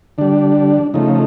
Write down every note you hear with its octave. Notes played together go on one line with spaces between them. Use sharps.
D3 G3 D4
C#3 F3 A3 D#4